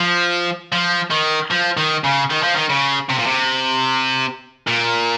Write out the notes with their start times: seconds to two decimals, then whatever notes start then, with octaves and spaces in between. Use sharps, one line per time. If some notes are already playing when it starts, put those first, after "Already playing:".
Already playing: F3
0.72 F3
1.11 D#3
1.51 F3
1.77 D#3
2.04 C#3
2.30 D#3
2.43 F3
2.56 D#3
2.69 C#3
3.09 C3
3.18 A#2
3.26 C3
4.67 A#2